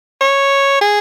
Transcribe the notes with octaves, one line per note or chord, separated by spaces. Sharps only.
C#5
G#4